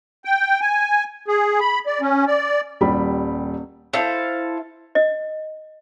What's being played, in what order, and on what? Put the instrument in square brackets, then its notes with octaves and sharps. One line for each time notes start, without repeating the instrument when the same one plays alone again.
[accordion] G5
G#5
G#4
B5
D5
C#4
D5
[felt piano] D#1 G3 B5
[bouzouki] E4 A4 C5 F5
[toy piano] D#5